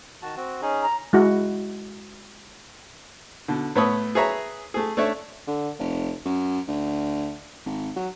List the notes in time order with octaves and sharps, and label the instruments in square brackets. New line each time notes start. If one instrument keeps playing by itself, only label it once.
[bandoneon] D#3 F#4 A5
C4 F#4
C#4 D#4 G#4
[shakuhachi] A#5
[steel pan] G#3 E4 F#4
[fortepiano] B2 D3
A2 B3 C#5 B5 D#6
G#4 B4 C#5 E5 A#5
A3 G#4
A3 D4 C#5 E5
[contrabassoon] D3
F1
F#2
D2
G#1
F#3